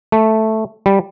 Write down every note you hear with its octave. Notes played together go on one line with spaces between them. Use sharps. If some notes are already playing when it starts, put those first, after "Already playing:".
A3
G3